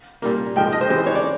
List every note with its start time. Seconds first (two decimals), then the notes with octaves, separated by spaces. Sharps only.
0.22 A#2 G3 A#3
0.56 G#2 F3 G#3 G5
0.72 D#5
0.81 C5
0.89 C3 E3 G#3
0.98 C5
1.06 C#5
1.15 D5